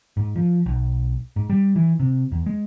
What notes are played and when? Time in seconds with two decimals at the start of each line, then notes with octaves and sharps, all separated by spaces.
0.17 G#2
0.36 F3
0.66 B1
1.36 G#2
1.50 G3
1.76 E3
2.00 C3
2.32 E2
2.46 G#3